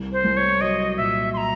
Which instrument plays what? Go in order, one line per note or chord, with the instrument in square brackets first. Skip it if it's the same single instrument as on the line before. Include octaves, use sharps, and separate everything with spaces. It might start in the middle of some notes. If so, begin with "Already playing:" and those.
Already playing: [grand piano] C2
[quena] C5
[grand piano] C2
[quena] C#5
[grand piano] F#3 [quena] D#5
[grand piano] A#2 [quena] E5
[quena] C6
A#5